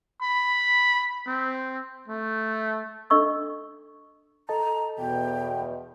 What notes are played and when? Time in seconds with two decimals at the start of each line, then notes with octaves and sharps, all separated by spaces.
0.22 B5
1.27 C4
2.08 A3
3.10 D4 A4 D#5 C#6 E6
4.49 A4 D#5 A5 A#5
4.98 E2 B2 G5